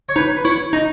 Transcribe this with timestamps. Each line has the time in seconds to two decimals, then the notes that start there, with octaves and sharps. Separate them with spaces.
0.09 C#5
0.16 D#4 B4
0.37 B4
0.44 E4 C#5
0.73 D#4 D#5